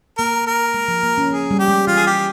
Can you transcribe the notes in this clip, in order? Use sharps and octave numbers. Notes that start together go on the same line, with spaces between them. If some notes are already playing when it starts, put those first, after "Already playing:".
A#3 A#4
A#4
G#3
F3
A#3
C#4
F3 G#4
G3
G4
G#3
E3 F4
G#4
G4